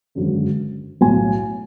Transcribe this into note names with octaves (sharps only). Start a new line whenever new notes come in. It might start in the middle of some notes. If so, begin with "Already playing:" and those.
G#1 F#2 D3 G#3
B1 A2 F#3 G#5